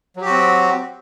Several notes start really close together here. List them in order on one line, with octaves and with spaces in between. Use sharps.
F#3 G4 F#4 C4